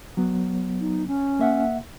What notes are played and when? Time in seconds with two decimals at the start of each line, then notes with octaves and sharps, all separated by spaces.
0.17 F#3 B3
0.80 D#4
1.07 C#4
1.39 A#3 E5 F#5